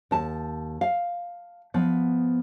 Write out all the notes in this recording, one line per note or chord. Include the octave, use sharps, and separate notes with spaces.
D#2 A5
F5
F3 B3